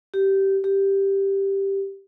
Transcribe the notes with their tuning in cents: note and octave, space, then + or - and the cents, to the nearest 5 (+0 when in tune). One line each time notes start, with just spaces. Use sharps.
G4 -15
G4 +0